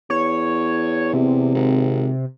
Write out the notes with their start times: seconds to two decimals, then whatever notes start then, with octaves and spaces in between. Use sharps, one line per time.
0.10 E2 C#5
1.13 C3
1.55 G#1